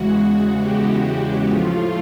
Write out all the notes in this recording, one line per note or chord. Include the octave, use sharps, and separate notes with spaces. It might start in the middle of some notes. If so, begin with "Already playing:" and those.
Already playing: E2 C#3 E3 G#3 F#4
F#4
G4
A2 F3 A3 F4